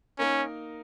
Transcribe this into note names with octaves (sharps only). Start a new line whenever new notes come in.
A#3 C#4 D#4 A#4